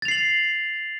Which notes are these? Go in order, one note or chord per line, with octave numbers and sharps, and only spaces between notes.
A6 C7 F7 F#7